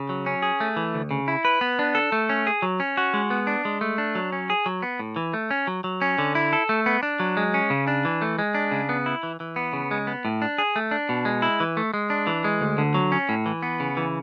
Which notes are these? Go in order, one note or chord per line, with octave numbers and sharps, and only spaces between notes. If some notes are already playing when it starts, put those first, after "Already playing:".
Already playing: C#3
F#3
C#4
G#4
A3
E3
D2
C#3
E4
B4
B3
D4
A4
A3
C#4
G#4
F#3
C#4
F#4
G#3
B3
D4
G#3
A3
D4
F#3
C#4
G#4
F#3
B3
A2
E3
A3
C#4
F#3
F#3
C#4
D3
E4
A4
A3
B3
D4
F#3
G#3
C#4
C#3
D4
E3
A3
G#3
D4
C#3
B3
E4
E3
E3
B3
C#3
G#3
B3
A2
D4
G#4
A3
D4
B2
G#3
E4
E3
A3
G#3
D4
E3
G#3
D2
D3
F#3
C#4
A2
E3
B3
C#3
E3